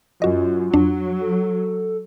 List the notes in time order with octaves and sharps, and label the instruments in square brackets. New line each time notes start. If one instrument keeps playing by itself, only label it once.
[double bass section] F#2 [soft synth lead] F4 [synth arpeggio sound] F#4 D#5
[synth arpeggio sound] F2 D4 [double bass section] F#3
[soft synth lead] A4